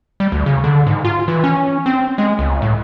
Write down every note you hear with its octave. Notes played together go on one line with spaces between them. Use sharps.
G3
D2
C#3
D3
G#2
F4
E3
C#4
C4
G#3
C#2
A2